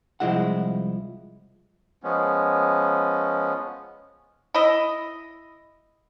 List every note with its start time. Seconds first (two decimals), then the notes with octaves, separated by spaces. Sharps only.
0.20 C2 D#3 F3 G#3 E4 F#5
2.03 F3 G#3 B3 C#4
4.54 E4 D#5